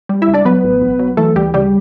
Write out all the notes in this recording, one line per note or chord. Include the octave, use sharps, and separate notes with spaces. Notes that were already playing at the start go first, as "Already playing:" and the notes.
G3
E4 E5
C#2
D4 D5
F#3 B3 B4
A1
B1
F#3
E3 A3 A4
D2 G3 G4
C#3 G3 G4